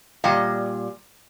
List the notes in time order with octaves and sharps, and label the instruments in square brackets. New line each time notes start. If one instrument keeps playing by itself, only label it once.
[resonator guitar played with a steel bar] A#2 G3 D#5